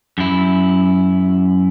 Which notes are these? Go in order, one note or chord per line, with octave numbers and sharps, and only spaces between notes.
F#2 E4